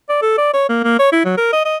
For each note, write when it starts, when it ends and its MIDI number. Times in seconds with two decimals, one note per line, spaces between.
0.09 0.19 74
0.22 0.35 69
0.38 0.52 74
0.54 0.64 73
0.69 0.82 58
0.84 0.98 58
0.99 1.11 73
1.12 1.20 64
1.25 1.33 54
1.37 1.52 70
1.53 1.61 75
1.65 1.77 75